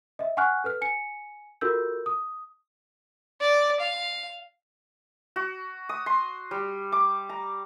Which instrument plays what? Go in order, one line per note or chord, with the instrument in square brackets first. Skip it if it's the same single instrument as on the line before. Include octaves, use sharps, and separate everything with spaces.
[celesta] D#5 E5
F#5 G#5 C#6 F6 F#6
A4 B4 F6
G#5 C#7
F4 F#4 A4 A#4 E6 G6
D#6
[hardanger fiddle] D5
F5
[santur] F#4
D#6
C6
G3
D6
A#5